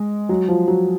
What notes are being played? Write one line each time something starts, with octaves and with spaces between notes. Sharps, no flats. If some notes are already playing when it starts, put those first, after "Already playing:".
Already playing: G#3
F#3
F3
F#3